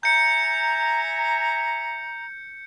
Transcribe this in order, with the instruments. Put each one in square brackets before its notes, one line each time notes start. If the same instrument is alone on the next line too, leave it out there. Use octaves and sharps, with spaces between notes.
[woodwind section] E5 G#5 A#5 [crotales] G6 C#7